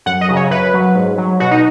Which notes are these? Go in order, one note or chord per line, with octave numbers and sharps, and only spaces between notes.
F#2 F#5
D#5
C#3 F#3
C#5
F#2 B4
F#3
G#2
F#3
B2 F#4
D#4